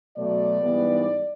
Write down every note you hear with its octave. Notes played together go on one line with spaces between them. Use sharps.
B2 F#3 A3 D5
G#2 E3 G3 B3